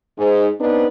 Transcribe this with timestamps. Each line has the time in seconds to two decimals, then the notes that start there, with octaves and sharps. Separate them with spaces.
0.18 G#2
0.60 B3 C4 D4 D#4 B4